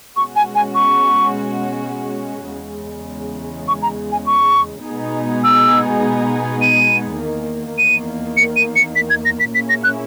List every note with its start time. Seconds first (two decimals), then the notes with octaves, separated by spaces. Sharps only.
0.16 B2 G#3 C#4 F#4 C#6
0.36 G#5
0.55 G#5
0.75 C#6
2.51 E2 C#3 G#3
3.68 C#6
3.83 A#5
4.12 G#5
4.26 C#6
4.85 B2 G#3 B3 D#4 G#4
5.44 E6
6.62 D#7
7.20 E2 D#3 A#3
7.78 D#7
8.37 C#7
8.56 D#7
8.76 C#7
8.96 B6
9.10 G#6
9.25 A#6
9.40 B6
9.55 A#2 A#3 C#4 E4 G#4 B6
9.69 A#6
9.84 F#6